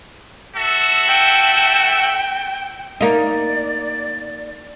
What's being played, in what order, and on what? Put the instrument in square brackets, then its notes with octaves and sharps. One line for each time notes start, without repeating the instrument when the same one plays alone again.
[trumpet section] F#4 A4 E5
[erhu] G5
[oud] A#3 D#4 [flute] D5